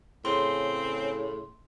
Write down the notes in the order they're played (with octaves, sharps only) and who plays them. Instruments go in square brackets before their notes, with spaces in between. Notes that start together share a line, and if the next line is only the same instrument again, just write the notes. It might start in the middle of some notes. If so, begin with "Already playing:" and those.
[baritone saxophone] A2 [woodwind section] C#3 [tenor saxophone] C4 [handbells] C6